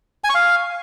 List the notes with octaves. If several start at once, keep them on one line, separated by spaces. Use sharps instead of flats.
G#5
C#6
F5